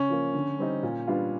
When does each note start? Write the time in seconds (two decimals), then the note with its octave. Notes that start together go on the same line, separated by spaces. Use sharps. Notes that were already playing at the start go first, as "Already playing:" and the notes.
Already playing: C#3 C#4
0.09 F3 A#3
0.34 D3
0.59 G3 C4 D#4
0.83 A#2
1.07 G3 B3 D4 F4